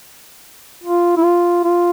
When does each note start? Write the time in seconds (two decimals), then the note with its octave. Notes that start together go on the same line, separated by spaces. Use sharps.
0.84 F4
1.17 E4
1.23 F4
1.64 F4